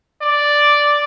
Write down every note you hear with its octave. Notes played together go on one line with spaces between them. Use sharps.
D5